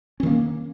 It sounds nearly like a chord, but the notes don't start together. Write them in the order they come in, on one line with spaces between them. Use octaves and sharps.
C#4 D#3 A#3